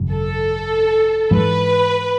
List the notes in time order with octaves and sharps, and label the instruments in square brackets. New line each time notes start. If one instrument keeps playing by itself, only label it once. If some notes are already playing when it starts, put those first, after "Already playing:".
Already playing: [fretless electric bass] G#1 F#2 C#3
[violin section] A4
[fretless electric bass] G#2 E3 G#3 [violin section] B4